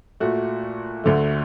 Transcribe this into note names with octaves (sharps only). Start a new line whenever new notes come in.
A#2 A3 F#4
D2 D3 A3